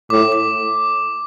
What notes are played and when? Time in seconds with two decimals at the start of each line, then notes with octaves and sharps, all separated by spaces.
0.10 A2 D6
0.32 D6